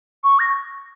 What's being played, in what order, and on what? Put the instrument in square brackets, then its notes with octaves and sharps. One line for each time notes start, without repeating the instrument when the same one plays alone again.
[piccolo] C#6
A#6